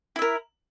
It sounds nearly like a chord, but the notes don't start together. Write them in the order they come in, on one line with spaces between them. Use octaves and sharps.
E4 E5 A#4